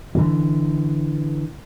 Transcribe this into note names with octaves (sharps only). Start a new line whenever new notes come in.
D3 E3